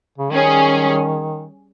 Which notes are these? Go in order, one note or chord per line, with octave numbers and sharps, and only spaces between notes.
C#3
D#3 G3 C#4 G#4